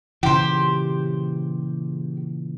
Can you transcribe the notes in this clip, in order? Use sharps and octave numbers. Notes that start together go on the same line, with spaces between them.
A#2 C#3 E3 G4 C5